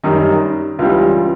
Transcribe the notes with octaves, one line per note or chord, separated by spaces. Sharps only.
F#2 D#3 G3 D#4
C#2 C#3 E3 G3 F4